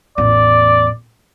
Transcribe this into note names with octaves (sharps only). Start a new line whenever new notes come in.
A1 E2 D5